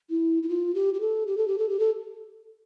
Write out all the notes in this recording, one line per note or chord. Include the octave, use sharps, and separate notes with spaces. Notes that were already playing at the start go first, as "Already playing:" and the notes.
E4
E4
F4
G4
G4
A4
G4
A4
G4
A4
G4
A4